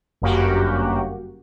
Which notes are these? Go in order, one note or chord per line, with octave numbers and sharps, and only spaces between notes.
G1 F#2 A#3 F#4 G4